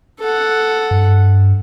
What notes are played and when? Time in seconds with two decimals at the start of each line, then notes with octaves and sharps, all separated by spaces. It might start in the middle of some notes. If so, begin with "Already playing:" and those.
0.20 A4 F#5
0.91 G2